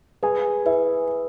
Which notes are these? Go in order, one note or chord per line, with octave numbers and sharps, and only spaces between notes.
G#4 B4 G#5
E4 B4 E5